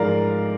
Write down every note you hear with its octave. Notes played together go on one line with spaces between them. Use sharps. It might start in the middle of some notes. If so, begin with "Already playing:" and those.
Already playing: G#2 F3 G#3 A#4 D5 F5